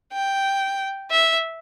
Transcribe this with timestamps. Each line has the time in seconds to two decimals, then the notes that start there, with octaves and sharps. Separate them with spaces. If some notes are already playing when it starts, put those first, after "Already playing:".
0.13 G5
1.12 E5